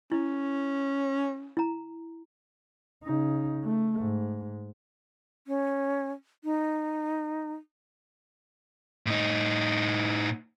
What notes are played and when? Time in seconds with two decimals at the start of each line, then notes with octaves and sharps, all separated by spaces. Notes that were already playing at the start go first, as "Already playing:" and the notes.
0.12 C#4 E4
1.57 E4 A#5
3.04 C#3 D#4
3.64 A3
3.98 G#2
5.47 C#4
6.44 D#4
9.06 A2 D#4